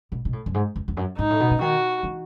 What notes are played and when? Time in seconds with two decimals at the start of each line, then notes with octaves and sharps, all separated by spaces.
0.12 B2
0.25 B2
0.33 A2
0.46 F#2
0.54 G#2
0.76 E2
0.88 E2
0.97 F#2
1.18 G#2 D#4
1.30 A2
1.40 B2
1.51 C#3
1.61 D#3 F#4
2.03 E3